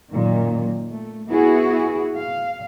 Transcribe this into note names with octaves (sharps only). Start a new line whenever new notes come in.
F#2 A#2 D#3
A3
B3 E4 F#4 G#4
F5